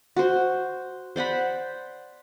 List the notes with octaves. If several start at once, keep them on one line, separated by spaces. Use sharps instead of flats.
F#4 C5
C5 D5 F#5 B5